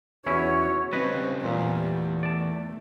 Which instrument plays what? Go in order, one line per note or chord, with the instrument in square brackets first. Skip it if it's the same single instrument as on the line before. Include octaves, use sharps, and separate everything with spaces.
[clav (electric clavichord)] E2 C#4 E4 [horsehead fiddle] F#4 C#5
[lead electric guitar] C#3 G3 [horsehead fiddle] C4 [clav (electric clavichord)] B4 C#5 D#5
[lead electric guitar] E2 [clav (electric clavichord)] A#2 [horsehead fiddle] G3 A3
[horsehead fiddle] A3 [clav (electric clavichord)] D5 A5